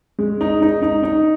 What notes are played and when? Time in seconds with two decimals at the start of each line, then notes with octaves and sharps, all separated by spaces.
0.19 G#3
0.41 D#4
0.62 D#4
0.82 D#4
1.03 D#4